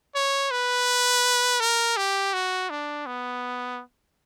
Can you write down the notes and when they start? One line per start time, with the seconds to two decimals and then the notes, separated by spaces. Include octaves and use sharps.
0.15 C#5
0.51 B4
1.60 A#4
1.97 G4
2.34 F#4
2.70 D4
3.06 B3